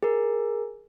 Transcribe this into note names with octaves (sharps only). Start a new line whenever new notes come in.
G#4 A#4